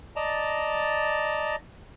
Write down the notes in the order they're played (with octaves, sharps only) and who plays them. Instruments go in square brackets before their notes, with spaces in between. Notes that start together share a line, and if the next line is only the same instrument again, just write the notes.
[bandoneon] D5 D#5 A5 A#5